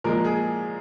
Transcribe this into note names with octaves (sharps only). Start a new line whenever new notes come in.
A#2 F3 G#3 A#4
G#4